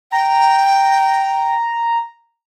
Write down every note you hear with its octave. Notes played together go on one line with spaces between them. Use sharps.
G5 A#5